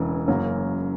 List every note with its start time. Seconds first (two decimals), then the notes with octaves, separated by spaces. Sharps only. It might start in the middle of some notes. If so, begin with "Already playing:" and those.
Already playing: E1 E2 C#3 E3
0.28 F#1 F#2 C#3 F#3 A#3